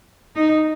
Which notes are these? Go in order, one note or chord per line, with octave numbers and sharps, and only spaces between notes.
D#4